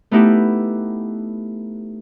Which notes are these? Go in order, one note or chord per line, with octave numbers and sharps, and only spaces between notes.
A3 B3 D#4 E4 G4